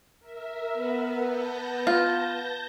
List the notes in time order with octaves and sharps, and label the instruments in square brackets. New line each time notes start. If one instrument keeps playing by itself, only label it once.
[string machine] A#4 E5
[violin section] B3
[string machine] A5 G6 A#6
[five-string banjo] F4